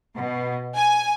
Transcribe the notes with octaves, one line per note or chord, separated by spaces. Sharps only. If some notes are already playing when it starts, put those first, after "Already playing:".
B2
G#5